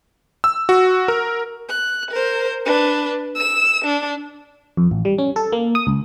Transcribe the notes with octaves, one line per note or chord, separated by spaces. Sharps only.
E6
F#4
A#4
F#6
A#4 C5
D4 B4
E6 E7
D4
F2
A1
G3
C#4
A4
A#3
D#6
C#2